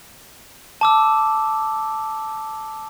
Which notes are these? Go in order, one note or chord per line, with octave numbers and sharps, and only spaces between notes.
A5 D6 E6